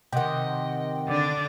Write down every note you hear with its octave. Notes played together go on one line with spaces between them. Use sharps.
C3 D#3 D#5 F#5 G5
D3 D4 D6